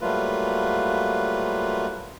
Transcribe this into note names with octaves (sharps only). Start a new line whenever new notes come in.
F#3 G3 A3 A#3 F4 B4